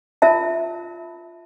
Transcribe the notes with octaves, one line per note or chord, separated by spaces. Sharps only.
F4 A#4 E5 A5